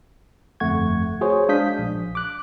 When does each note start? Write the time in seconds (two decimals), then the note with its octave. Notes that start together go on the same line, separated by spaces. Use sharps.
0.60 G1 F2 A3 F#5 C#6 G#6
1.21 F#4 G#4 C5 C#5
1.48 G#3 D4 F5 D#6 G6 B6
1.79 A#1
2.15 D6 F#6